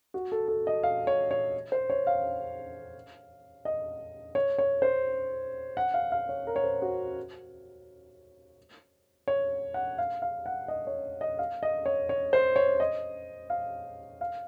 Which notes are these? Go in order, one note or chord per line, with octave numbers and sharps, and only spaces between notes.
F#4
A4
A4
D#5
F5
C#5
C#5
C5
C#5
F5
D#5
C#5
C#5
C5
F#5
F5
F5
C#5
A#4
C#5
C5
F#4
C#5
F#5
F5
F5
F#5
D#5
C#5
D#5
F5
D#5
C#5
C#5
C5
C#5
D#5
F5
F5